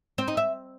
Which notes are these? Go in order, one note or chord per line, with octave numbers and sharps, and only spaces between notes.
C4
D#4
E5